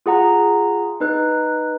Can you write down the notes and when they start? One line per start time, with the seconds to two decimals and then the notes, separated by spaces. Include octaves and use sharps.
0.06 F4 G#4 F#5 A#5
1.01 D#4 B4 F#6